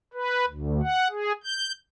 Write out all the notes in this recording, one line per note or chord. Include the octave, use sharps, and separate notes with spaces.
B4
D2
F#5
G#4
G6